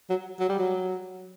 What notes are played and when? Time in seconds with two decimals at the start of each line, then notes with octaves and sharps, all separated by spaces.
0.10 F#3
0.40 F#3
0.49 G3
0.59 F#3